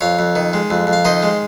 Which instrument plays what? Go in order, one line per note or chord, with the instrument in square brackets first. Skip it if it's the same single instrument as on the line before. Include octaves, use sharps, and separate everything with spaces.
[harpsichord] F2 C#5 F5
F2
D#3
G#3
F2
F2
F5
D#3 C5 D#5
G#3